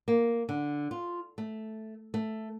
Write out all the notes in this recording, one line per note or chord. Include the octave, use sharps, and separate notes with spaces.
A#3
D3
F4
A3
A3